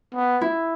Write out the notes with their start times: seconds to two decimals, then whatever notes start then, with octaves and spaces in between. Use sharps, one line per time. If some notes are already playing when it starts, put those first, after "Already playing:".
0.14 B3
0.41 E4